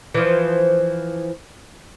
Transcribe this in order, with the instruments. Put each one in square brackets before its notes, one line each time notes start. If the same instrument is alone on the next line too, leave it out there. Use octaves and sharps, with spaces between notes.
[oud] E3 F3